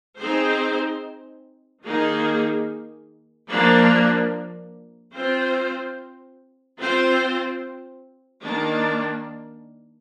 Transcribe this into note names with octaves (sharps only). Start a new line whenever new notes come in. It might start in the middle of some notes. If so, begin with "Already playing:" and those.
C4 D#4 G#4 C5
D#3 A#3 D#4 G#4
F3 A#3 D4
C4 F4 C5
C4 F4 C5
D#3 A#3 D4